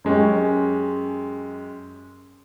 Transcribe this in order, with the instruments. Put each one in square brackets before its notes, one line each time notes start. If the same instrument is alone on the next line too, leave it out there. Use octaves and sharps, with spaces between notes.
[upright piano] F#2 G#3 C#4 G4